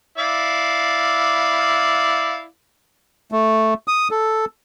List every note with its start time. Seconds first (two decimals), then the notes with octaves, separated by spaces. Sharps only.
0.18 E4 D5 F5
3.32 A3
3.88 D#6
4.11 A4